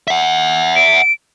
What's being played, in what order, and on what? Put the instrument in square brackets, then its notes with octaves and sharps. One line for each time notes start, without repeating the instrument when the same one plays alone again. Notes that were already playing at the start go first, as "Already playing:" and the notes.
[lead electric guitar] E5 F#5
[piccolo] D7